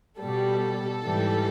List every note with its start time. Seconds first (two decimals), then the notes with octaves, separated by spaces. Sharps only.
0.20 B2 G3 A4
1.03 G#2 E3 G3